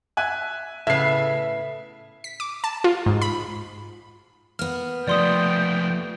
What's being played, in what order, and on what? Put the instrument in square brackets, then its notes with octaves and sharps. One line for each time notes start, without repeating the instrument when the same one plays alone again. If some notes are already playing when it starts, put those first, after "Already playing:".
[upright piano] E5 G#5 F#6
[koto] A2 B3 [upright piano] C#3 [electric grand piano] E5 C7
[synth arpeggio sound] B6
D6
A5
F4
G#2
B5
[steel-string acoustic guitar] A#3 B3 [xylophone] F6
[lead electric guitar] F3 A3 [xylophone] D5 C6 D#6 [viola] G5